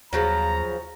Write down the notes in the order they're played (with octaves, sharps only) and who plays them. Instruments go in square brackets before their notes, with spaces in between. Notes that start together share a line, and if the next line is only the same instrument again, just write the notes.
[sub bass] D#2 [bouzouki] C#3 F3 F#3 [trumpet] A#5